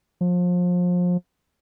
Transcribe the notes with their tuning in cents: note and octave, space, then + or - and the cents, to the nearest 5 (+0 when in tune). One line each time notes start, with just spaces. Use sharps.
F3 +30